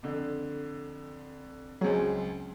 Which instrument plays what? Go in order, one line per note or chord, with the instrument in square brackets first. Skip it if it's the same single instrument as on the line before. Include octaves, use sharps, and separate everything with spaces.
[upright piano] F2 D3
[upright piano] C#2 C4 G#4 [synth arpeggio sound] F#3